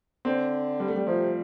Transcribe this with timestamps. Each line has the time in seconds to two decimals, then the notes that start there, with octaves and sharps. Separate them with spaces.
0.25 D3 C4
0.80 G3
0.88 A3
0.96 G3
1.07 C3 F3